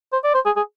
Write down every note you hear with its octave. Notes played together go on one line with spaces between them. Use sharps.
C5
D5
C5
G#4
G#4